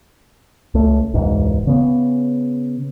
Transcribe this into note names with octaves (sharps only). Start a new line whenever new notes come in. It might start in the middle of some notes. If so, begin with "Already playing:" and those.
C#2 A3
E1 C#2 G#2
C#3 B3